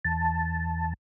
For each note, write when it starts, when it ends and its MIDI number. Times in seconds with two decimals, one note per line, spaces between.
0.05 0.93 40
0.05 0.93 81